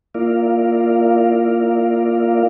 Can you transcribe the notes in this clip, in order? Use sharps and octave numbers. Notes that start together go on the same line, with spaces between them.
A#3 E4 F4 A#4 D5 F5